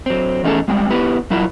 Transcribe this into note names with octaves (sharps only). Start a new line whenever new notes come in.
F#3 C4
E2 A3 C#4 D#4 G#4 A4
G3 G#3 C4 G5
B3 E4 G4 B4
G2 F#3 E4 F4 A#4